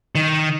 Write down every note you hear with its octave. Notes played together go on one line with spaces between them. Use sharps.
D#3